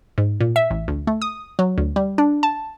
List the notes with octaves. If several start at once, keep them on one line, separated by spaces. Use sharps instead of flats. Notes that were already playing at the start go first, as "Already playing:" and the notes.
G#2
A#2
E5
A1
D2
A3
D#6
F#3
D2
G3
D4
A5